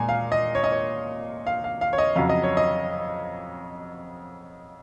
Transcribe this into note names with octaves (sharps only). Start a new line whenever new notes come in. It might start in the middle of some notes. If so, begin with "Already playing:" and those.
Already playing: A#2 G#3 G#5 A#5
F5
D#5
C#5
D#5
C#5
F5
F5
F5
C#5
D#5
F2 C#3 F#3 F5
D#5
C#5
D#5